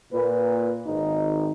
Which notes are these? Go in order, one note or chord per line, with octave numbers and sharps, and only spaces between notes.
A#2 B4
G#1 D#4